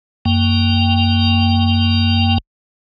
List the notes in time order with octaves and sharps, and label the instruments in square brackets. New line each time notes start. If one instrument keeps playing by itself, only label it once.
[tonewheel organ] F#2 A#3 G5